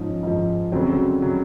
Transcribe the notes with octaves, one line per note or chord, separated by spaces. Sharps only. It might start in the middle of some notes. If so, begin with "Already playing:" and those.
Already playing: G#2 F3 C#4 D#4
G#2 F3
D2 C#3 F#3 C4
C#3 F#3